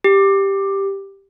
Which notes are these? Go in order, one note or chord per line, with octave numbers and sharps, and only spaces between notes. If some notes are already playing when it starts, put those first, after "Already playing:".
G4